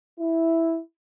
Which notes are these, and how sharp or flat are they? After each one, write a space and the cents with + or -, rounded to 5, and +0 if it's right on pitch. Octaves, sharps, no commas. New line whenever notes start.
E4 -5